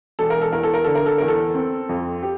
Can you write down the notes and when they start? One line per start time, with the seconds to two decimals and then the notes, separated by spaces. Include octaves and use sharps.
0.19 E1 A4
0.30 A#4
0.42 A4
0.52 E2 A#4
0.63 A4
0.74 A#4
0.84 D3 A4
0.95 A#4
1.06 A4
1.18 E2 A#4
1.28 A4
1.55 C4
1.89 F2
2.23 G4